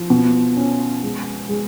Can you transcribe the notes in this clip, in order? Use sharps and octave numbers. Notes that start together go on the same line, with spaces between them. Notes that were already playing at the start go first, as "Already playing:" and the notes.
Already playing: F3
B2
C#4
G#3
G#3